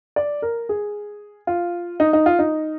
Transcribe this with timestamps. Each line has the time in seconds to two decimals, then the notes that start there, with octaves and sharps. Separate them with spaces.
0.16 D5
0.42 A#4
0.69 G#4
1.47 F4
2.00 D#4
2.13 D#4
2.26 F4
2.39 D#4